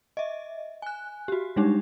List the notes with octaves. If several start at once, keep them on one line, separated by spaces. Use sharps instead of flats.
D#5 E5
G#5 F#6
F#4 G4
G3 G#3 D4 D#4 G4